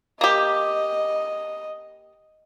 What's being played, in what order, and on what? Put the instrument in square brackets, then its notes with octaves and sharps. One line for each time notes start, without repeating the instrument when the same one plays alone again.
[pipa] A#3 G4 [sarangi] D#5